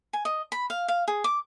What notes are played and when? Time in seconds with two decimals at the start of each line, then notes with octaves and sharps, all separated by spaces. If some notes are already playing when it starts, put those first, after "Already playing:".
0.13 G#5
0.25 D#5
0.52 B5
0.70 F5
0.88 F5
1.08 G#4
1.24 D6